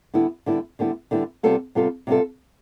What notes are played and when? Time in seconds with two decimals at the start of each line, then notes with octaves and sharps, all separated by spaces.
0.14 D3 G3 B3 E4
0.46 D3 G3 B3 E4
0.79 D3 G3 B3 E4
1.11 D3 G3 B3 E4
1.43 C3 G3 B3 F4 A4
1.75 C3 G3 B3 F4 A4
2.07 C3 G3 B3 F4 A4